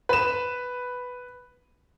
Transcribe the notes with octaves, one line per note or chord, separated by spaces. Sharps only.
B4 E7